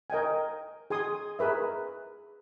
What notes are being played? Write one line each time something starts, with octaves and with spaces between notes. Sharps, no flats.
A#4 D#5 G5 G#5
G#4 G#5 C6 D#6
G#4 A#4 B4 E5